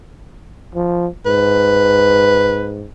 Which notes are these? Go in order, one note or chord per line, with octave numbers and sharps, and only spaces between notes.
F3
G#2 B4